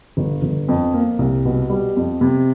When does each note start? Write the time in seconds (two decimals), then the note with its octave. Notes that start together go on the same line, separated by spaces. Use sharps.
0.17 G1
0.42 G1
0.68 F2
0.94 A#3
1.19 C2
1.45 B2
1.70 G3
1.96 F2
2.21 C3